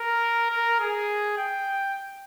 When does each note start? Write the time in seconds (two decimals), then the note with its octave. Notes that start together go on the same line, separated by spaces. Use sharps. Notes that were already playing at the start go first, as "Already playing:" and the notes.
Already playing: A#4
0.50 A#4
0.79 G#4
1.38 G5